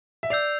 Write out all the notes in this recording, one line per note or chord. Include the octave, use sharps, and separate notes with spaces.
E5
D5 E6 G6 C7 F7